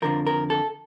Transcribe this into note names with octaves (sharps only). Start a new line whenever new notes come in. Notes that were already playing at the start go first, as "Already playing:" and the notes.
F2 D3 F3 A#4
A#4
A4